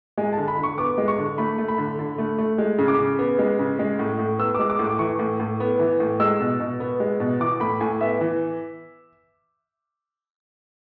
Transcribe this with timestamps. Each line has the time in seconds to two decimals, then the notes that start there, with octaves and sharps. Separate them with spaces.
0.18 G#3 G#5
0.33 D3 A5
0.48 B5
0.58 D3
0.63 C#6
0.78 B3 D6
0.98 G#3
1.08 C#6
1.18 D3
1.38 A3 B5
1.58 A3
1.68 B5
1.78 D3
1.99 D3
2.18 A3
2.38 A3
2.58 G#3
2.78 C#3
2.88 D6
2.99 C#3
3.19 B3
3.39 G#3
3.59 C#3
3.79 G#3
3.99 A2
4.19 A2
4.39 B3 E6
4.55 G#3 D6
4.70 D6
4.79 A2
4.84 D6
4.99 E3 C#6
5.19 A2
5.39 A2
5.60 B3
5.79 E3
6.00 A2
6.20 G#3 E6
6.40 B2
6.60 B2
6.80 B3
7.00 G#3
7.20 B2
7.40 E3 D6
7.60 A2 B5
7.80 A2 G#5
8.01 B3 E5
8.21 E3